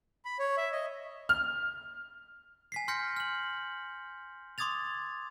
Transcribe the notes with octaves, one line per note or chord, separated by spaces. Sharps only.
B5
C#5
E5
D#5
F6
G#5 B6 C7
C6 F6 G6 A#6 C#7
F6 F#7
C6 D6 D#6 G#6 A6 F7